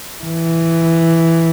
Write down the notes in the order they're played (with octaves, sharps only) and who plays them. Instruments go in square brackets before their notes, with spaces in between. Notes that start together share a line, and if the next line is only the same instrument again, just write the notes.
[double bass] E3